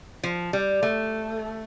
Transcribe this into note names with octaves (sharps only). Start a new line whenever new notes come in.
F3
G3
A3